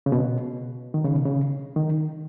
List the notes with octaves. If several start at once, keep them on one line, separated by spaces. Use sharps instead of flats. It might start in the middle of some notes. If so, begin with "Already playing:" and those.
C#3
B2
D#3
C#3
B2
C#3
D#3